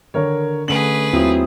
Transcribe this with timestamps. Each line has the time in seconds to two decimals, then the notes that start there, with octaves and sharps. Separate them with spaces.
0.14 D3 D#3 A#4 C#5
0.68 D3 A3 C#4 G#4 B4 F#7
1.13 D#2 F#3 C4 E4 F4 D#6